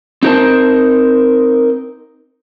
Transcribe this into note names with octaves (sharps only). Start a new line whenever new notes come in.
C4 D#4 G4 A#4 C5 A5